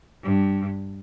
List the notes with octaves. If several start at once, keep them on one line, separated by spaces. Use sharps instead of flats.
G2